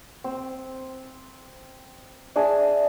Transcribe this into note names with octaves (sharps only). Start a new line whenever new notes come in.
C4
D4 G#4 E5 G#5